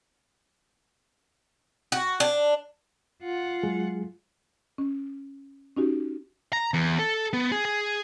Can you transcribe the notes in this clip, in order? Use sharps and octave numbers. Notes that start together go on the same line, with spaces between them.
F#4
D4
F4 F#5
F#3 G#3 G#4
C#4
C#4 D#4 F#4 G4
A#5
E2
A4
B3
G#4
G#4